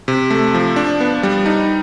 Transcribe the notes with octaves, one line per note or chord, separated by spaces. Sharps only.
C3
A3
F3
D4
B3
G3
D#4